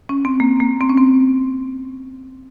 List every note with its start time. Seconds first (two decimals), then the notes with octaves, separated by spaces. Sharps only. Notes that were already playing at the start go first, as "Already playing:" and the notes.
0.09 C#4
0.25 C4
0.40 A#3
0.60 A#3
0.81 C4
0.89 C#4
0.98 C4